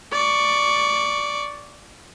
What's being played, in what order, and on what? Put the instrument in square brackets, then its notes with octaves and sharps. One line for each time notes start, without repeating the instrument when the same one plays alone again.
[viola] D5 C#6